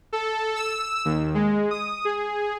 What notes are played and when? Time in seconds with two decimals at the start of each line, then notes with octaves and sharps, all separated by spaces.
0.13 A4
0.56 E6
1.05 D#2
1.35 G#3
1.71 D#6
2.05 G#4